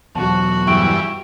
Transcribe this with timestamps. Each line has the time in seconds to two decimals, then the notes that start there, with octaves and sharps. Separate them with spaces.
0.15 E2 B2 F#3 F#4 A5
0.67 G2 E3 C#6 D7